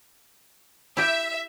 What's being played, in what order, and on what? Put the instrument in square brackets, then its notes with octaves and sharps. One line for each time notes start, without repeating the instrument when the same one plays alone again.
[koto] E4 G4 [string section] E5